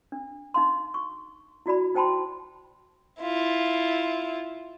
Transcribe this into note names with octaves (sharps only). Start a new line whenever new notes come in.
D4
D#4 F5 C6
C#6
E4 F#4 D5 B5
D#4 C5 G5 A5 B5 C6
E4 F4